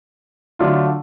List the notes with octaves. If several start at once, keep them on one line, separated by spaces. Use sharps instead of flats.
D3 F#3 A3 D4 F4